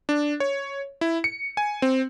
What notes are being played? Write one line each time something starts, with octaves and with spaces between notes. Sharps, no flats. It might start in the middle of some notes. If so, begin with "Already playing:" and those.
D4
C#5
E4
C#7
G#5
C4